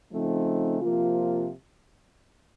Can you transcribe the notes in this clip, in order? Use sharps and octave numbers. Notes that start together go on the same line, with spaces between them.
C#3 F3 A3 C4 D#4
C3 F3 A#3 F4